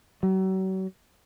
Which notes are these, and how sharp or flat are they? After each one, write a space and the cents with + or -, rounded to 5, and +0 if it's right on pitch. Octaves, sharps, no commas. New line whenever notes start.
F#3 +40